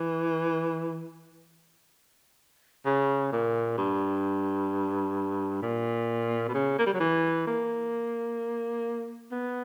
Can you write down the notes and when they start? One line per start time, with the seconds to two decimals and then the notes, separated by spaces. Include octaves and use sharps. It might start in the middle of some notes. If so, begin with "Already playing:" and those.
Already playing: E3
2.85 C#3
3.32 A#2
3.78 G2
5.62 A#2
6.48 B2
6.54 C#3
6.79 A#3
6.86 G3
6.94 F#3
7.00 E3
7.47 A#3
9.31 B3